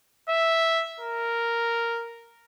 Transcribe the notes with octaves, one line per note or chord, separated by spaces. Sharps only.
E5
A#4